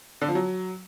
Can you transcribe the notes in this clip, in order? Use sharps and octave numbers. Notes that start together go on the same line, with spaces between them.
D3
F3
F#3